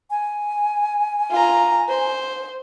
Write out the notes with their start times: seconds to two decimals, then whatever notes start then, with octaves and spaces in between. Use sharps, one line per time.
0.10 G#5
1.31 F4 A#5
1.88 C5